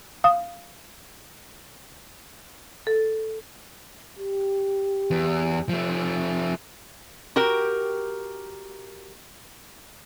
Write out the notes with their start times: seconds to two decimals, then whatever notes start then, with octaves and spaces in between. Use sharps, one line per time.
0.24 F5 D#6
2.87 A4
4.19 G4
5.11 E2
5.69 F3 A3
7.36 F#4 G4 A#4 G5